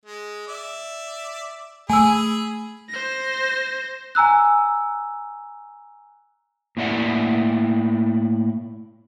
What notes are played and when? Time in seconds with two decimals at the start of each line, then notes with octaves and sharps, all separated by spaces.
0.05 G#3
0.47 D5 E5
1.90 A3 G#4 G#5 B5 E6
2.89 C5 A#6
4.15 G#5 A#5 E6 F#6
6.77 A2 A#3 E4 D5 E5 F#5